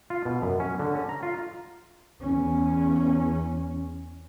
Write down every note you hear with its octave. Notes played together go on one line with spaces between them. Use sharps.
F4
B2
F#2
C#4
D3
C#4
A#5
F4
E2 C#4